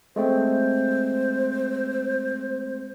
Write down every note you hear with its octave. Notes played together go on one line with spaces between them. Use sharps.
G#3 A3 C4 C5